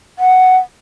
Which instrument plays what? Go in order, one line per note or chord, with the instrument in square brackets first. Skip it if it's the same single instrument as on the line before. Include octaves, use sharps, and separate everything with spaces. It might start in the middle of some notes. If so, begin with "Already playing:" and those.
[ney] F#5